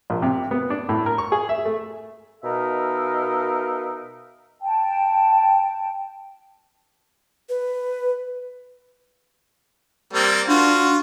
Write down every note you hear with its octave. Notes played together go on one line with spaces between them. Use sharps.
A#1
C3
B3
D4
A2
A#4
C#6
G#4
E5
A3
B2 D#4 A#4 E5 F5
G5 A5
B4
G3 A#3 C4
D4 F4 F#4